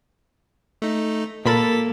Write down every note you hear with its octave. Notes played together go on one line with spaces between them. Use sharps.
A3 D#4
A#2 A#3 A4 A#4 B5 A6 B6